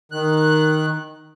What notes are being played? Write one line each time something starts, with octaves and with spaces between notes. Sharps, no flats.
D#3 F#6